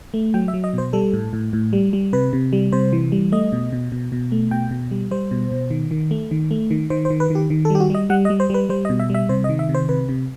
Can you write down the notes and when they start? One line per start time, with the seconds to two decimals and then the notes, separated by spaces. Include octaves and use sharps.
0.14 A3
0.34 F#3 G5
0.48 E5
0.54 F#3
0.64 D#5
0.74 B2 C5
0.93 G3 A4
1.13 A2
1.33 A2
1.53 A2
1.73 G3
1.93 G3
2.13 C3 B4
2.33 C3
2.53 G3
2.73 C3 C5
2.93 E3
3.12 G3
3.32 A3 D#5
3.52 B2
3.72 B2
3.92 B2
4.12 B2
4.32 A3
4.51 B2 G5
4.71 B2
4.91 G3
5.11 G3 C5
5.31 B2
5.52 B2
5.70 D#3
5.91 D#3
6.11 A3
6.31 D#3
6.51 A3
6.71 D#3
6.90 D#3 C5
7.05 C5
7.10 D#3
7.20 B4
7.30 D#3 G4
7.50 D#3
7.65 A4
7.70 G3 G4
7.80 F#4
7.90 G3 D#5
8.10 G3 F#5
8.25 D#5
8.30 G3
8.40 C5
8.50 G3 B4
8.69 G3 C5
8.85 D#5
8.90 B2
9.00 E5
9.10 G3 E5
9.29 C3 C5
9.44 D#5
9.49 D#3
9.59 E5
9.69 C3
9.75 C5
9.89 C3 B4
10.09 C3